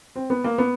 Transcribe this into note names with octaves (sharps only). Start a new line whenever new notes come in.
C4
B3
A#3
B3